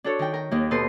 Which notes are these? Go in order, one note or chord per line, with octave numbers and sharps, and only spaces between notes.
D4 F#4 A4 C#5
D#3 G5
A#4 G5
D#2 D#3 A#3
B2 A4 B4 D#5 C6 G6